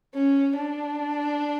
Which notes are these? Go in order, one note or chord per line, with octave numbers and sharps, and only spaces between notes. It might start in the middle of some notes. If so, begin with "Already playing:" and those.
C#4
D4